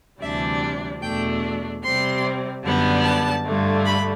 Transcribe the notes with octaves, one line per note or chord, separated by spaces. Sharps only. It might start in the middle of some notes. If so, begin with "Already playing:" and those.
D2 C3 E3 G3 D4 E5
E2 B2 A3 D4 G5
C3 G3 C4 C6
F#2 D3 G3 B3
A5
G2 D3 A3
B5